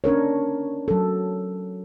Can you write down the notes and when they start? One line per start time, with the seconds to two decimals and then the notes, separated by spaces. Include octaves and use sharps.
0.04 C#4 D4 A#4 C#5
0.88 F#3 A4